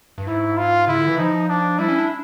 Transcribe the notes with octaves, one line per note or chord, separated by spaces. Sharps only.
G2
G#2 E4
F4
C#3 E4
D3
E3
F3 D#4
D4
G3 E4
C#4
D4